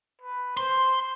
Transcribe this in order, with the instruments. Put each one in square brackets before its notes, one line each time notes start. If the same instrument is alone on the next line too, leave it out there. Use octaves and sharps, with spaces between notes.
[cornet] B4
[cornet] C5 [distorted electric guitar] C6